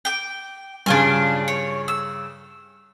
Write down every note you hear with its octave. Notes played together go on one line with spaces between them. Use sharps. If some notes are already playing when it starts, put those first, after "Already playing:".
G5 D6
G2 C#3 D4 F4 G#5
C#5
E6